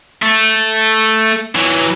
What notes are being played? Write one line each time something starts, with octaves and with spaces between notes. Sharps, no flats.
A3
E3 F#3